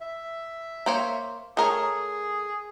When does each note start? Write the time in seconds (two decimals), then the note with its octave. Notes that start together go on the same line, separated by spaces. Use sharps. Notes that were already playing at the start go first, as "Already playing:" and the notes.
0.01 E5
0.86 A#3 C5 C#5
1.57 A3 G#4 A#4 C#5